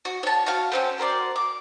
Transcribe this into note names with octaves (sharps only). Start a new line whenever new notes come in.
F#4
C#5 A5
F#4 F5 A5
A3 C4 C#4
F#4 A#4 C5 D5
D6